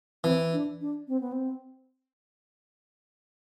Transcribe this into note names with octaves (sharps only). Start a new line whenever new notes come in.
E3 C4
D4
D4
C4
B3
C4